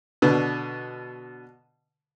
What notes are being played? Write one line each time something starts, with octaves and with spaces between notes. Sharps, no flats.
B2 D3